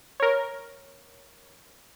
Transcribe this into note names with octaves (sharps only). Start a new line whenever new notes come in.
A#4 C#5